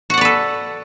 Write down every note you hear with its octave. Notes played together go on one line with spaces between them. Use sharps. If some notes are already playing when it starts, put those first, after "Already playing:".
F#4 A4 B4 D5 F#5